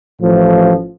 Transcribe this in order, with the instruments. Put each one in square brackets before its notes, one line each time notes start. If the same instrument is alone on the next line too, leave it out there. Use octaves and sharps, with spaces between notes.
[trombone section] A1 A2 F3